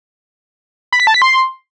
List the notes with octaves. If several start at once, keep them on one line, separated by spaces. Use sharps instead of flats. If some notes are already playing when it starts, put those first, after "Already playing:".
B5
B6
A5
B6
C6